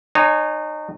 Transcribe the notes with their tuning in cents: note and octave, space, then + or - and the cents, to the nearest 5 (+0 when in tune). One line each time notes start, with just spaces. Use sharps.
D#4 -30 C#5 +0 G#5 +0